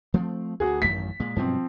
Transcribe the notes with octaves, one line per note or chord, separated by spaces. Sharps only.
F3 A3 C4
D2 F#4 G#4
A1 F#2 D#3 B6
A#2 G#3
G2 B2 F3 F#3 C4